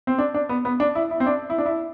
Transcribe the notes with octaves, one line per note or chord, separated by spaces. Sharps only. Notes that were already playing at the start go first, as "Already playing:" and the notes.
C4
D4
D4
B3
B3
D4
E4
E4
C4
D4
E4
D4
E4